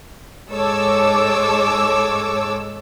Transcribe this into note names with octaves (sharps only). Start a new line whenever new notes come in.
G#2 G#3 A4 C#5 D6 E6